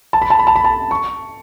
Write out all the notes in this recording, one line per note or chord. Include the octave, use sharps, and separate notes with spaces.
A5
B5
A5
B5
A5
B5
A5
C#6